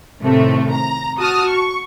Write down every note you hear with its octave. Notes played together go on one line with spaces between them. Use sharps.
A2 C3 D#3 A3
A#5
F#4 A5 D#6 F6
C#6